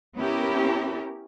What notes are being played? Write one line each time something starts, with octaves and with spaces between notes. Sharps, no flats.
B3 C#4 E4 G4 A#4